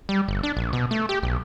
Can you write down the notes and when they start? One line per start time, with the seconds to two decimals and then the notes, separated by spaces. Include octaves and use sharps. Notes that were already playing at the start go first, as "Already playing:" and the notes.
0.09 G3
0.28 G1
0.43 D4
0.57 A#1
0.73 B2
0.91 A3
1.09 G4
1.23 B1